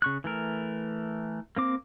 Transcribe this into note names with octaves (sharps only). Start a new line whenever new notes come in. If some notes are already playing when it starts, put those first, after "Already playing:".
C#3 C#6 F#6
E3 A3 A#4
A#3 C4 D6